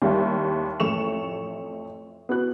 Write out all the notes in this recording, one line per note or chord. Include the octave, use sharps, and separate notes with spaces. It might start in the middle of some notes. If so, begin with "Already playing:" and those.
D#2 G3 E4 E5
A1 F2 A3 C#6 E7 F7
B3 F#4 F#6